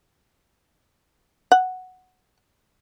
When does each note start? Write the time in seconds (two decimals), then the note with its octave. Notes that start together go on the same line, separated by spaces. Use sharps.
1.52 F#5